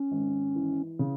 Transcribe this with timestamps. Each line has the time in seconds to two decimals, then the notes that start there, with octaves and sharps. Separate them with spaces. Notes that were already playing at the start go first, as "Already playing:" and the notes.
Already playing: C#4
0.11 G#1
0.55 E3
0.99 C#3